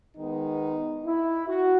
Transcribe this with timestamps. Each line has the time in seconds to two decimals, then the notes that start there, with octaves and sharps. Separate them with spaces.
0.16 D#3 G#3 B3 D#4
1.05 E4
1.48 F#4